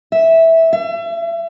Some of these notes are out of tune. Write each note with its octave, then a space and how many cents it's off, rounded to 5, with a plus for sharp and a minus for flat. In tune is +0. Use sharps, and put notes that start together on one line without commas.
E5 -10
E5 +35